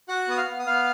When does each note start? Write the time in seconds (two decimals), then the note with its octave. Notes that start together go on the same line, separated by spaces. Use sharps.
0.08 F#4 F#5 F#6
0.28 B3 D#6
0.37 F5 F6
0.47 B3
0.59 D#6
0.66 B3 F5 F6